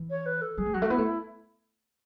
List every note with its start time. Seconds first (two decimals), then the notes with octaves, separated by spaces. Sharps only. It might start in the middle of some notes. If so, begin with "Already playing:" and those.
Already playing: E3
0.10 C#5
0.26 B4
0.42 A4
0.58 F#3 G#4
0.66 A3
0.74 F#3 F#4
0.82 A3
0.90 B3 E4
0.98 A3